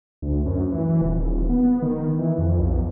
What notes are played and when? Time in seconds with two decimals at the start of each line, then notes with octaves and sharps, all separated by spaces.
0.22 D2
0.46 F#2
0.72 E3
1.02 D#1
1.49 B3
1.82 D#3
2.19 E3
2.38 F2
2.60 B1